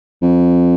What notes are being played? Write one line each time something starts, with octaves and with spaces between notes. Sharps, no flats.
F2